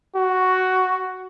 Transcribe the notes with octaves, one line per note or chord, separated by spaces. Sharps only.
F#4